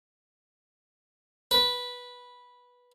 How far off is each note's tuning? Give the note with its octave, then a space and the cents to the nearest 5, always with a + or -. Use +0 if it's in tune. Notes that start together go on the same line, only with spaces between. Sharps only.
B4 -10